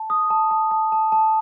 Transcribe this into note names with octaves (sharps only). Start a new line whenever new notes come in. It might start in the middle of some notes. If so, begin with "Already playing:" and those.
Already playing: A5
D#6
A5
A5
A5
A5
A5